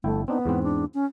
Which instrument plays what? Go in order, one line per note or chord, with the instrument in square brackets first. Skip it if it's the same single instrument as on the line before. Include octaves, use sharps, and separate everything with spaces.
[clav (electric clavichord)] G1 E4 G5 [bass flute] A3
[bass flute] B3 [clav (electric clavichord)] C4 D4 D#4
[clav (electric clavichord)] E2 G#2 C4
[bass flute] D4
C#4